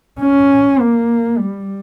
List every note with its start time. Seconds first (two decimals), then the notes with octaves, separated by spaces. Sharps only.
0.21 C#4
0.80 A#3
1.38 G3